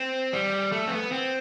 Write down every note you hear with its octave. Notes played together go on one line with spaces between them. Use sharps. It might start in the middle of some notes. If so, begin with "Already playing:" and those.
Already playing: C4
G3
A3
C4
B3
C4